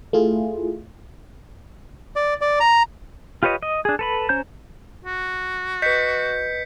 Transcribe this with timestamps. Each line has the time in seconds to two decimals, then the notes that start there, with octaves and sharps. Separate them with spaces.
0.13 A3 E4 F4 G#4
2.16 D5
2.41 D5
2.60 A#5
3.43 F4 G4 B4 C#5 D#5
3.62 D#5
3.85 D4 G#4
3.99 A4 B4 B5
4.29 C#4 C5 A#5 G6
5.05 F#4
5.82 B4 D#5 G6 B6 C#7